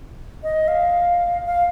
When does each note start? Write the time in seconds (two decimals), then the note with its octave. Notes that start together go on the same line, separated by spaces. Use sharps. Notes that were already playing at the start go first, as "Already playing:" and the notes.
0.43 D#5
0.68 F5
1.46 F5